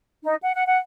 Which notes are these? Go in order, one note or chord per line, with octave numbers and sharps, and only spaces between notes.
D#4
F#5
F#5
F#5